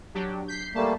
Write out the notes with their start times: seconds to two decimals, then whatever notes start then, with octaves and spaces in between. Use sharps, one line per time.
0.14 F#3 D4 G4
0.48 G6 B6 C7
0.75 G3 A3 A#3 A5